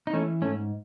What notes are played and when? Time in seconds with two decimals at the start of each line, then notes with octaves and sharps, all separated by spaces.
0.07 D#4
0.13 E3 A3 C#4
0.42 G#2 A3 C#4